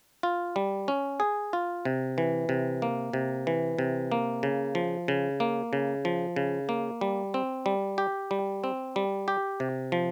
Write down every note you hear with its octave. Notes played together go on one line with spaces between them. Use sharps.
F4
G3
C#4
G#4
F4
C3
E3
C3
A#3
C3
E3
C3
A#3
C#3
F3
C#3
A#3
C#3
F3
C#3
A#3
G3
C4
G3
G4
G3
C4
G3
G4
C3
F3